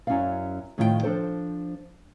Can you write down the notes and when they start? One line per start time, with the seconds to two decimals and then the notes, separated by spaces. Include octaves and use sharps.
0.07 F#2 F#3 C#4 E4 D5 F5
0.78 A2 D#3 F3 F4 G#4 G5
1.03 F3 D4 A4 C5